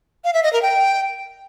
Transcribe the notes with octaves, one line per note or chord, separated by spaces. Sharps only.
F5
E5
D#5
A#4
G5